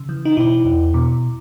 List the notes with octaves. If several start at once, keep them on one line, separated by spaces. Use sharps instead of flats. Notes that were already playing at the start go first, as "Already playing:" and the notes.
Already playing: C#3
E3
D#4
B2 E4
E2
B2